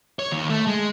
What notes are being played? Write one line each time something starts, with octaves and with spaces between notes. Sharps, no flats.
C#5
D#2
A3
G#3